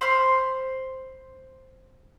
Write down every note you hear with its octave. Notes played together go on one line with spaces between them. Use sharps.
C5 B5 C6 F6